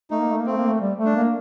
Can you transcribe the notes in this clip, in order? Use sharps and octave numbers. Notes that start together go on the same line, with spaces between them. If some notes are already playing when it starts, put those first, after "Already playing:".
A3 D#4
A#3
A3
A#3
A3 C4
A#3
A3
G3
A3
D4
A#3